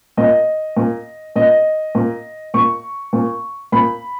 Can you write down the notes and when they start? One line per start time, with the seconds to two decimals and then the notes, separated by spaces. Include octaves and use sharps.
0.17 A#2 D#5
0.77 A#2
1.36 A#2 D#5
1.95 A#2
2.54 A#2 C#6
3.13 A#2
3.72 A#2 B5